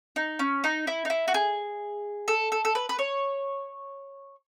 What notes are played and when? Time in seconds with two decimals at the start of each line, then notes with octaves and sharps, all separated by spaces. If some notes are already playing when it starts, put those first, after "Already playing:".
0.16 D#4
0.39 C#4
0.64 D#4
0.87 E4
1.05 D#4
1.10 E4
1.28 F#4
1.34 G#4
2.28 A4
2.52 A4
2.65 A4
2.75 B4
2.89 B4
2.99 C#5